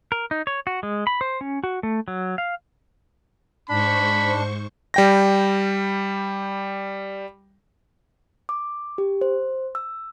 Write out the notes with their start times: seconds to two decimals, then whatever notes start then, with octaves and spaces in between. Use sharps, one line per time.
0.12 A#4
0.31 D#4
0.47 C#5
0.67 F#4
0.83 G#3
1.07 B5
1.21 C5
1.41 C#4
1.64 F#4
1.83 A3
2.08 F#3
2.38 F5
3.69 G#2 D4 C5 B5 C#6
4.94 G3 G5 A#6
8.49 D6
8.98 G4
9.21 C5
9.75 E6